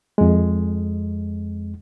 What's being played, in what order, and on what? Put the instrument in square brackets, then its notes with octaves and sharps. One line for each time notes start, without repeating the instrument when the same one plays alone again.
[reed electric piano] F2 G#3